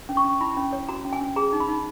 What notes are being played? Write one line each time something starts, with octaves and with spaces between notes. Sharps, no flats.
C#4
C#6
C#4
E4 B5
C#4
C#5
F#4 A#5
C#4
G#5
C#4
G#4 A#5
D#4
B5
D#4